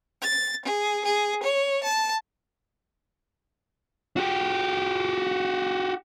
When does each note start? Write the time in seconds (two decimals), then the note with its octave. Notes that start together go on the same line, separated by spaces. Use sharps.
0.20 A6
0.64 G#4
1.04 G#4
1.43 C#5
1.83 A5
4.17 F#4 G4